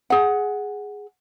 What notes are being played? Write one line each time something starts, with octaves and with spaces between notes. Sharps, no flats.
G#4 F#5